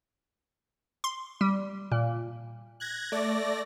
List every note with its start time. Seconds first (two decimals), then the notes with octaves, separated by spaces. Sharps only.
1.04 C6
1.41 G3
1.92 A#2
2.80 F#6 G#6 A#6
3.12 A3 D5 A#6